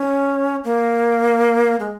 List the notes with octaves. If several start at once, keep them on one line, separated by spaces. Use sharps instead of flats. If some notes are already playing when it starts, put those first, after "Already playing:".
Already playing: C#4
A#3
G#3